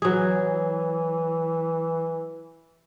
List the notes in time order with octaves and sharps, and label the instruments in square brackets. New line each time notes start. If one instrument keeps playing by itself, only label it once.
[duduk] E3 [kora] F#3 G#4